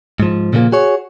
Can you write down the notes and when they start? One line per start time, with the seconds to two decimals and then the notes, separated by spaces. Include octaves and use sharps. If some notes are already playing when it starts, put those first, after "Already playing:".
0.20 G#2 F3
0.53 A#2 C#3 F3 A#3
0.72 F#4 G#4 C#5